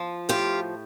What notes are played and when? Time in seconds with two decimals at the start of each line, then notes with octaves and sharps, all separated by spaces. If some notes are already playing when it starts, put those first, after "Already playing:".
Already playing: F3
0.29 A2 F4 G4